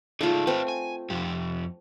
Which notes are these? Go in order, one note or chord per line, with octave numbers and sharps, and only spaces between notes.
A3 D#4 F4 G#4 D5
C4 A4 B4
G#5
F2 G4